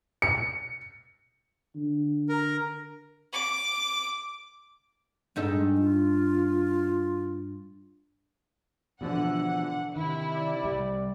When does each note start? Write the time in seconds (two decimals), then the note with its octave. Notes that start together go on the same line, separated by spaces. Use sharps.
0.22 C#7
1.75 D3
2.29 A#4
3.33 D6
5.36 G2 G#3 D#4 A4
5.78 F4
9.01 B2 D3 E3 F3 F#5
9.96 C3 D#3 E4
10.32 D5
10.63 C2 G3